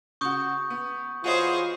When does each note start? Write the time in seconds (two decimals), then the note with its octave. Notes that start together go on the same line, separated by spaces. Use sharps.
0.21 C#3 F#4 C#6 D#6 G6
0.70 B3
1.24 E3 B3 F4 F#4 G#4 C5 C#5 D#5